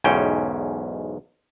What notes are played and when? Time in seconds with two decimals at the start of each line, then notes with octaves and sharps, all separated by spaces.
0.04 B1 E2 G#2 C#4 G5